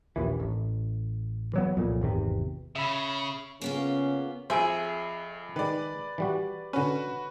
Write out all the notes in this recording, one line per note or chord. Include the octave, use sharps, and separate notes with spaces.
A#1 D#2 E3
A1
E3 F#3 B3
C2 F2 A#2
G#1 E2 C3
C#3 E5 B5
C#3 A#3 B3 C#4 F4
F2 G#4 C5 E5 D7
D#3 G#3 B4 D5
E3 G3 F#4
D3 C#4 F#4 B4